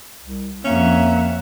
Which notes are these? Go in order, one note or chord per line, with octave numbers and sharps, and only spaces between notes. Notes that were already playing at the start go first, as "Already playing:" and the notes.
C2
F2 A#3 C#4 E5 F#5